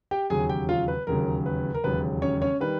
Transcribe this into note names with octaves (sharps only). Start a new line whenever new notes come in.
G4 G5
E1 D#2 C#3 F#3 G#4 G#5
G4 G5
F4 F5
B4
E1 D#2 C#3 F#3 A#4
B4
A#4
E1 D#2 C#3 F#3 B4
C#4 C#5
C#4 C#5
D#3 G3 B4